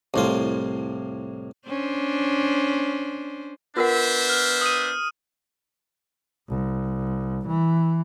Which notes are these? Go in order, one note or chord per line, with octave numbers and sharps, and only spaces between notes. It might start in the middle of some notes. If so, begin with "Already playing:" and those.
C2 A2 F4
C#4 D4 C5
B3 D4 F4 A#4 C5 E5 F#5
F6
D#6 D#7
C2
E3